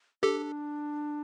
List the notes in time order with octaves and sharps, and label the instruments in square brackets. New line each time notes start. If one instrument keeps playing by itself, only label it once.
[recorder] D4 [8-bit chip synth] G4 A4